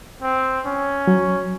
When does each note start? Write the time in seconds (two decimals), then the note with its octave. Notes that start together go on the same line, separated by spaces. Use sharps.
0.22 C4
0.66 C#4
1.07 F#3